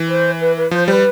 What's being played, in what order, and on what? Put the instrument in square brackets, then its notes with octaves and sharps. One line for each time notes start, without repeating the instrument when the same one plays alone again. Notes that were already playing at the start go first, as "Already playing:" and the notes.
Already playing: [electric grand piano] E3
[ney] C5
B4
B4
[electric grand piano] F3 [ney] C5
[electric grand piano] G3 [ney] B4 C5